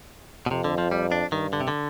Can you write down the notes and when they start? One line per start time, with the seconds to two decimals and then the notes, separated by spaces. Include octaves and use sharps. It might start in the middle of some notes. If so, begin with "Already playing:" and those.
0.46 B2
0.51 F2 C3
0.64 D3
0.78 F3
0.91 G3
1.12 D4
1.32 G2 D#3
1.53 D3
1.60 C3
1.68 D3